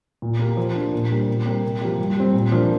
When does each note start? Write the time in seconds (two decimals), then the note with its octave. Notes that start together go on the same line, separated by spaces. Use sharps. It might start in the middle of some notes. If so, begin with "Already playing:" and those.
0.22 A#2
0.39 A#3 G4
0.57 F3
0.75 A#3 D4
0.92 A#2
1.10 G3 D4 A#4
1.29 A#2
1.45 G3 C4 G4 A#4
1.64 C3
1.81 F3 A#3 G4
1.99 G2
2.16 G3 C4
2.33 A#2
2.52 F3 D4 A#4